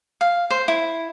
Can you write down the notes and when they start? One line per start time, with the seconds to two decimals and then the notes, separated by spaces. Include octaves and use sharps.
0.21 F5
0.50 C5
0.68 E4